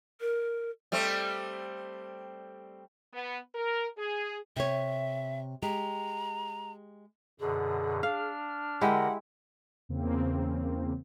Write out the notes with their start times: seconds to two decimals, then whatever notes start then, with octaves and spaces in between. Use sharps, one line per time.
0.21 A#4
0.92 G3 A3 C4
3.13 B3
3.55 A#4
3.98 G#4
4.56 C3 C#5 E5
5.63 G#3 G4 A#5
7.40 F#2 B2 D3 G#4
8.03 D4 F5 F6
8.81 D3 G#3 E4 G4 A#4 F#5
9.89 E2 C#3 A#3 C4